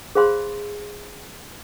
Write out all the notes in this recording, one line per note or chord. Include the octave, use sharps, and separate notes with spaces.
G#4 C5 F5 B5 C6